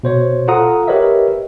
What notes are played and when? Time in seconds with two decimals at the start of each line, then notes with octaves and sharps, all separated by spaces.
0.03 B2 C5 C#5
0.48 F4 A4 F5 F#5 A#5 D#6
0.87 G4 A#4 B4 C#5 D#5 E5